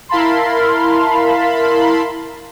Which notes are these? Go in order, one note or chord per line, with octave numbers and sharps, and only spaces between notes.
E4 A#4 F5 A5 B5 C6